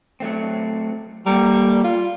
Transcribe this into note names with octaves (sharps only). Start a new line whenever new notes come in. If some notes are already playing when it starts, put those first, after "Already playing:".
F#3 A3 C4
G3 A#3 A4 A#5
F4